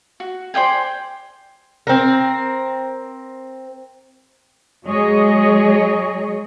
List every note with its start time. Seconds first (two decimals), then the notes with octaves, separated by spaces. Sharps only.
0.20 F#4
0.54 C5 D5 G5 G#5
1.87 C4 A#4
4.85 F#3 G#3 G#4 C#5 D#5